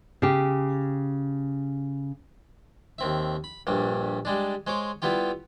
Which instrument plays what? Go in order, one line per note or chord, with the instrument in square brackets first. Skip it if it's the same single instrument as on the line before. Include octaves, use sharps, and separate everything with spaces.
[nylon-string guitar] C#3 G4
[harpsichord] D#2 C4 E5
B5
A#1 G2 G3
G3 G#3 D4
G#3 C5 C#5 D6
G3 B3 E4 F4 G4